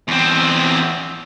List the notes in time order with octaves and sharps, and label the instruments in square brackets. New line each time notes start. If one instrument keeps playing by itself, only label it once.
[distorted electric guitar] E2 C4